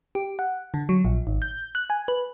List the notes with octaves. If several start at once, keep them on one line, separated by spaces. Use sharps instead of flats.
G4
F#5
D3
F#3
A#1
G#1
G6
F#6
G#5
B4